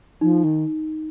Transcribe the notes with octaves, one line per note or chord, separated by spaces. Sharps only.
F3 D#4
D#3